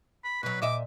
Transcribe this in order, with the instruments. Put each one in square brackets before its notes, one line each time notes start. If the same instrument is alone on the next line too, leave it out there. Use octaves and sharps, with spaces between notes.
[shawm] B5
[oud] B2 F#3 [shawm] B4
[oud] A#2 D#5 E5 [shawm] D6